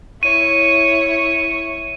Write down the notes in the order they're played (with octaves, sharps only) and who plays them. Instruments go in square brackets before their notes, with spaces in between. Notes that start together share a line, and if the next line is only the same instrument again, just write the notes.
[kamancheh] E4 C#5 [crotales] D#7